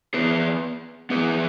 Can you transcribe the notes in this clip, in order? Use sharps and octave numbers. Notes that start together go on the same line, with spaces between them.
B3 G#4 B4
B3 G#4 B4